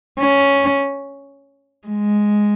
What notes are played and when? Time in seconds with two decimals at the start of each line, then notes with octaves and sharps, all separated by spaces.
0.19 C#4
1.88 G#3